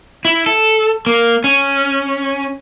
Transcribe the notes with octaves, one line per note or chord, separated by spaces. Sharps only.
E4
A4
A#3
C#4